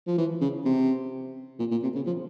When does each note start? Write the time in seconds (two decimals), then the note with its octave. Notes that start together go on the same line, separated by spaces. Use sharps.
0.07 F3
0.18 E3
0.41 C#3
0.65 C3
1.59 A#2
1.71 A#2
1.83 C3
1.96 C#3
2.06 F3